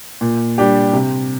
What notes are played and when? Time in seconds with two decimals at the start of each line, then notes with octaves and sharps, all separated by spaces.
0.21 A#2
0.58 G3 D4 G4
0.93 C3